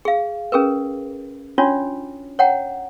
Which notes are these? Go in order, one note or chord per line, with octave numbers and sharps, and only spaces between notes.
G#4 F5
C#4 G#4 A#4 B4
C#4 D4 F4 F#4 C#5
C#5 F#5 G5 A#5